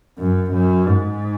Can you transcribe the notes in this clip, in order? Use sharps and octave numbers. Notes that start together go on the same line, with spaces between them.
F#2
F#2
G#2